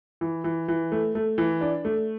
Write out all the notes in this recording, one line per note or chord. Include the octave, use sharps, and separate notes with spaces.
E3
E3
E3
A3
A3
E3
D4
A3